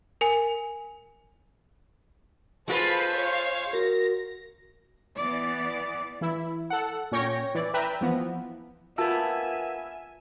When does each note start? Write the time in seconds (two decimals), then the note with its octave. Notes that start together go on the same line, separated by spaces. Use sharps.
0.21 A#4 G#5
2.68 G#3 F4 A4 B4 C5 B6
3.13 C#5 F5
3.73 F#4 A#4 A#6
5.17 E3 B3 D5
6.21 E3 E4
6.70 A4 F#5
7.12 A#2 C#4 C#5 G5 C#6 A#6
7.55 E3 D5
7.74 B4 E5 G5 A#5
8.01 E3 F3 B3
8.98 A#3 B3 F4 E5 G#5 A5 E6